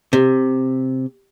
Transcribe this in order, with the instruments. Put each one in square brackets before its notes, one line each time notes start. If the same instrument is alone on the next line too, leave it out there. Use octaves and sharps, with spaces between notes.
[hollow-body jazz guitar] C3